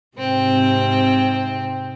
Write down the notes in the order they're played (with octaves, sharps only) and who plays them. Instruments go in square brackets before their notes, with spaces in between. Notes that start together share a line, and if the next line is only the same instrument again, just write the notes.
[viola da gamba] G#2 C3 [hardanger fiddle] C4